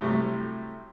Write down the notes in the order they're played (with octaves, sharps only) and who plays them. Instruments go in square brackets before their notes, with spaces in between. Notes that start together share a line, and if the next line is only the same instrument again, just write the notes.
[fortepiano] A2 C3 F#3 G3 A3